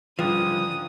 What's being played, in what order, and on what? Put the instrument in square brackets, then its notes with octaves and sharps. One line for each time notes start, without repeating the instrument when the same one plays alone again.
[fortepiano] C#2 G#2 D3 [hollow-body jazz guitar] F3 [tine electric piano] G3 B4 G5 [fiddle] D#6